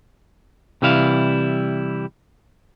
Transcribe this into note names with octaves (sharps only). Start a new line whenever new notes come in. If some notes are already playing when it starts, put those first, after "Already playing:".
C3 E3 G3 E4 F5